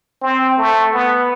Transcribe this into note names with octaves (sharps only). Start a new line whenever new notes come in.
C4
A3
B3